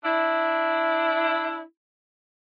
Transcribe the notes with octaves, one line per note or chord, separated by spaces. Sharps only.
D4 E4